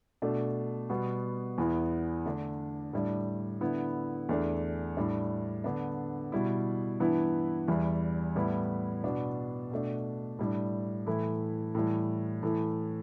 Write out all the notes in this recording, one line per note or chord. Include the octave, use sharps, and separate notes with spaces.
B2 A3 D4
B2 G3 B3
E2 E3 B3 E4
D3 A3 D4
A2 G3 D4
D3 B3 E4
E2 E3 A3 D4
A2 G3 D4
D3 B3 D4
B2 G3 E4
G2 E3 B3 E4
E2 E3 G3 E4
A2 G3 B3 E4
B2 B3 D4
B2 A3 D4
A2 G3 D4
A2 E3 A3 E4
A2 E3 G3
A2 E3 A3